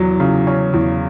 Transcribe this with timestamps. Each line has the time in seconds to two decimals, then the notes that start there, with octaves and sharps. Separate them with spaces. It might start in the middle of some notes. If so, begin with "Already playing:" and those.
Already playing: E2 F#3
0.20 C#3
0.47 C#4
0.74 E2